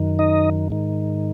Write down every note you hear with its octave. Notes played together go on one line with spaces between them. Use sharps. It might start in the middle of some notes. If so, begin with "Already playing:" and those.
Already playing: F#2 D#3
D#4 D#5
G#2 D#3